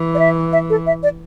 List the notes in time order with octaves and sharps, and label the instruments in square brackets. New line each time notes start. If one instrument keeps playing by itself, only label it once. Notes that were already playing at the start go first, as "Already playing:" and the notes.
Already playing: [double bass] E3
[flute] D5
E5
E5
A4
E5
D5